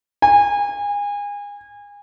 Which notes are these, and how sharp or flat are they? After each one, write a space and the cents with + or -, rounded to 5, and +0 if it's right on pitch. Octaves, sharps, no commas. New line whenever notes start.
G#5 -30